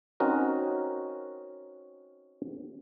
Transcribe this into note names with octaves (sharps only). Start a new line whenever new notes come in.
C4 C#4 D#4 F#4 A#4